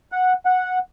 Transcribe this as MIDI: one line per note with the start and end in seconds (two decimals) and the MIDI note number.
0.12 0.33 78
0.46 0.79 78